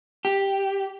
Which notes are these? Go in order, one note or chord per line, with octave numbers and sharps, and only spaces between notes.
G4